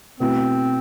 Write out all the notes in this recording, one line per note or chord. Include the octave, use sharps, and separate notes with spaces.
B2 A3 C4 E4